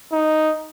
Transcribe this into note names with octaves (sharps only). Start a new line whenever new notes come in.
D#4